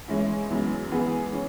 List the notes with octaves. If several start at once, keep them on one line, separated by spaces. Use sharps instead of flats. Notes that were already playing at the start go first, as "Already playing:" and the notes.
E3 G#3 C#4 E4
F#2 E3 G#3 B3
E3 B3 G#4
E3 C#4